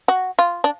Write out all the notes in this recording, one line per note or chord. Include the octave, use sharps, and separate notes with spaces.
F#4
F4
D4